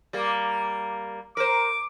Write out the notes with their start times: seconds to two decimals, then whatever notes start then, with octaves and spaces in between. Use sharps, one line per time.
0.13 G3 A#3
1.37 A#4 C5 D6